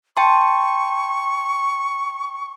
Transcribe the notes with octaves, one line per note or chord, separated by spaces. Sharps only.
G5 A5 C6 C#6